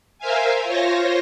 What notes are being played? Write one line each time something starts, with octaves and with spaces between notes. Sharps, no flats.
A#4 C5 E5 F5 G#5
F4 C5 C#5 A#6